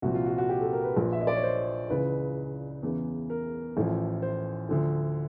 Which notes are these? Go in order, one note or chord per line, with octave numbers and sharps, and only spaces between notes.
C2 A#2 F3 F#4
F4
F#4
F#4
G4
A4
A#4
B4
A#1 A#2 F3
E5
D#5
D5
C#5
C5
C#2 C#3 E3 B4
E2 C#3 E3
A#4
A1 A2 F3
C5
D2 D3 F3